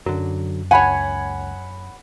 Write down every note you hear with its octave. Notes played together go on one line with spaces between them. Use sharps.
F#2 D3 F#3
C#2 C#5 F#5 G#5 B5